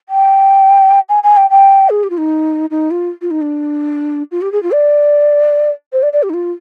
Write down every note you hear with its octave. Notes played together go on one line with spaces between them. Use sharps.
G5
G#5
G#5
G5
G5
G#4
G4
F4
D#4
D#4
F4
F4
D#4
D4
F4
G4
G#4
F4
D5
C5
D5
D5
G4
D#4
F4